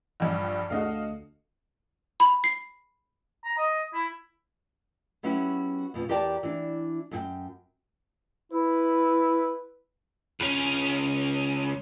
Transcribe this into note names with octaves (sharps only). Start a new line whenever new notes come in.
A#1 G2
D2 F#4 A4 D#5 F5
B5
C7
A#5
D#5
E4
F#3 B3 C#4 E4 F#4 G4
F2 B2 F3 C#4
E2 G4 A#4 D5 G5 A5
E3 D4
F#2 G#4 G5
E4 B4
C#2 C#4